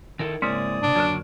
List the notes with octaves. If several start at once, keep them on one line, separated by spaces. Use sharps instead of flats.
D#3 E4 A4 A#4
G#2 C#3 G#3 A#3 C4 E4 D5 D#6
G2 C3 D4
F2 D3 F#3 A#4